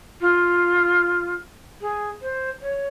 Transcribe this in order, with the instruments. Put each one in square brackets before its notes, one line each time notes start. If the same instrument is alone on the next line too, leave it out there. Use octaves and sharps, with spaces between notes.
[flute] F4
G#4
C5
C#5